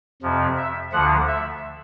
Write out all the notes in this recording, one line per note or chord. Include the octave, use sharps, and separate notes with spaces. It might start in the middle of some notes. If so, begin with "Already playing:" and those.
F2 C3 F3
E5
D2 D3 F3 F#5
E5